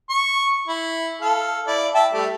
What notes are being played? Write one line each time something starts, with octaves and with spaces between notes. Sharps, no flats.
C#6
E4
A4 F5
E4 D5
E5 G5 A5
G3 A3